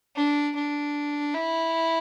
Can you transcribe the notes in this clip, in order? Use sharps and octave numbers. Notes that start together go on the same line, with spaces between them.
D4
D4
E4